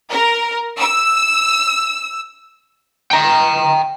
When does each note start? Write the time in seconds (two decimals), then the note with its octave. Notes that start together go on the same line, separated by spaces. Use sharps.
0.10 A#4
0.79 E6
3.12 G5 A#5